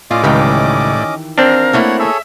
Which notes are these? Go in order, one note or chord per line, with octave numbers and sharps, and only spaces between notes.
A2 C#4 F4 D5 D#5 D6
C#2 D#3 E3 G4
C4 D4 A#4 F5
A3 A#3 E4 C#5 F#5
G#4 A4 C#5 E5